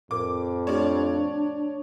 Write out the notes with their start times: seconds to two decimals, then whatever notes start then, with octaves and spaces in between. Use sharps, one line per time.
0.11 F2 A2 A#4 D6
0.67 A3 D4 G4 C#5 D5